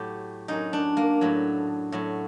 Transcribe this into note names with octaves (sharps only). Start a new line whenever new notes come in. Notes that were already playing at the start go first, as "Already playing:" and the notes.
Already playing: A2 F#3 G4
F#2 F#3 D#4
D4
A#3
A2 F#3
A2 F#3